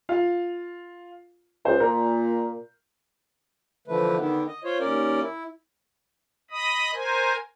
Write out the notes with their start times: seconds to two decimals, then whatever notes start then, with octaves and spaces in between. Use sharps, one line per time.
0.09 F4 F5
1.65 C#2 C5
1.80 A#2 A#4
3.88 D3 E3 F3 A3 B4
4.18 D3 D#3 B3
4.47 D#5
4.64 F4 C5 C#5
4.80 D#2 C#4 A#4 D5
5.21 E4
6.51 D#5 B5 D#6
6.94 A#4 C5 G#5